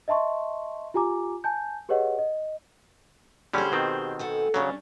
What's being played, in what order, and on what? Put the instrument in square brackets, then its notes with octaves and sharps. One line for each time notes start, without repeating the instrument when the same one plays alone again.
[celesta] D#5 E5 A5 C6 C#6
F4 G4 G#5 A#5 D6
G#5 A5 G6
G4 G#4 B4 C#5 D#5 F#5
D#5
[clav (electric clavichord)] D3 G3 C#4 [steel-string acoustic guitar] G4 G#4 C5
[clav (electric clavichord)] B2 D#3 C4
[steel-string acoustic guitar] A4 F#5 G#5
[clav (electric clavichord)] C#3 F#3 [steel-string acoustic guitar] G3 C#4 D4